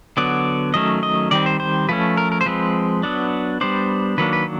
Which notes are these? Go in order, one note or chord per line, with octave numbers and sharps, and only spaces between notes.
D3 F#3 B3 D5
D#3 F#3 A3 C#4 D#5
D#5
D#3 G3 C4 D5
C5
C5
F3 A3 C#4 B4
A#4
A#4
C5
F3 G#3 C4 B4
F#3 B3 D4
G3 B3 D4 C5
D#3 F#3 A#3 D4 B4
B4